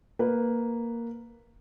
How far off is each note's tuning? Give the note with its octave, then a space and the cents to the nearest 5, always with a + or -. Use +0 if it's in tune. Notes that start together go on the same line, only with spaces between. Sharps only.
A#3 +0 B4 +0